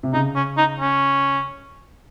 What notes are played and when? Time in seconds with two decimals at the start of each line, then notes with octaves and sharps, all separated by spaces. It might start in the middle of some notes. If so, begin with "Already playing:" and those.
0.03 C3
0.13 C#3 D#4
0.36 C#4
0.57 D#4
0.80 C#4